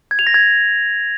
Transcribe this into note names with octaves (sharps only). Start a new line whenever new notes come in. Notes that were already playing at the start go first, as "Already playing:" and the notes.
G#6
F7
A#6
G#6